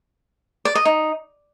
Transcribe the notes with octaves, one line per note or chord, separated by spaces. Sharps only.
D5
D#5
D#4